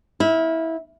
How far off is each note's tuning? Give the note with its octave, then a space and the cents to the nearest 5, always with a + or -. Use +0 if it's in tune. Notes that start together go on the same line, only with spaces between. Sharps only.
E4 -20 F5 +5